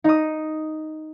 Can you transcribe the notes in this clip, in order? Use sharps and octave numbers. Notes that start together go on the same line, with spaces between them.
D#4 D#6